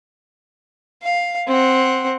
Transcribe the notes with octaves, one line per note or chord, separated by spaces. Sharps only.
F5
C4 F#5